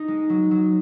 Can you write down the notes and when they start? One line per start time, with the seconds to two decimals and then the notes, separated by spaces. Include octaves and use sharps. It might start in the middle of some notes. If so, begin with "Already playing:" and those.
Already playing: D#4
0.08 G#3
0.29 F#3
0.51 F#3